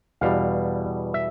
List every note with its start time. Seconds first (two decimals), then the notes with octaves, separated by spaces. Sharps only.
0.21 E2 B2 G3 F5
1.14 E5